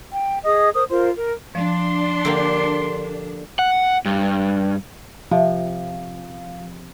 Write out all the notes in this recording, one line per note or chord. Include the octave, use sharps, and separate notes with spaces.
G5
G#4 D#5 D#6
A#4 C5 D#6
F4 A#4 C5 C6
A#4
F3 D4 C6
D3 A#3 G4
F#5
G2
C3 F3